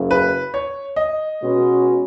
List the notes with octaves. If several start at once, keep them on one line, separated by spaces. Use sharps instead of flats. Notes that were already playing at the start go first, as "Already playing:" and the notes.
Already playing: F#1 F#2 C#3
B4
C#5
D#5
B2 G#3 C#4 F#4 B4